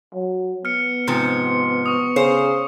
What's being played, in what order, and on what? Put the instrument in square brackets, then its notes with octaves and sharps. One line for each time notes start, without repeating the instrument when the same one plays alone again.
[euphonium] F#3
[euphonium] B3 [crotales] F6 C#7
[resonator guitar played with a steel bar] G#2 C3 F3 [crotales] C#7
[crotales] C#6 D#6
[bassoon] C#3 [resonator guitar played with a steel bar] C5